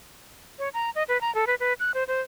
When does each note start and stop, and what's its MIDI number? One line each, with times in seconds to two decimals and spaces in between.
0.59 0.69 73
0.74 0.90 82
0.95 1.03 75
1.08 1.20 71
1.21 1.33 82
1.35 1.45 69
1.47 1.55 71
1.60 1.73 71
1.80 1.91 90
1.94 2.04 72
2.08 2.21 72